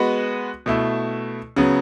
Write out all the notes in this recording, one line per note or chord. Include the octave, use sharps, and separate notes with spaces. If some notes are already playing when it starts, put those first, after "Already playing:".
Already playing: G#3 B3 F#4 B4
B2 A3 E4
C#3 F#3 B3